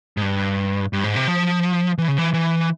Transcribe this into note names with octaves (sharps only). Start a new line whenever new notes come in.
G#2
G2
G2
G#2
C3
F3
E3
C#3
E3
E3